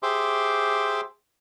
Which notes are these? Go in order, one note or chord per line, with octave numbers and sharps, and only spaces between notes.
G4 G#4 C5 E5 C6 D6